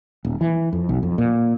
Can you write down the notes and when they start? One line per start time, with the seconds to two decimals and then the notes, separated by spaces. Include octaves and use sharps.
0.25 D#1
0.41 E3
0.73 F2
0.89 B1
1.03 F2
1.18 A#2